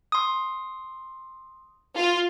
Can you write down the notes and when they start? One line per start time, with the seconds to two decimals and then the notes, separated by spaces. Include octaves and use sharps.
0.12 C6 D#6
1.96 F4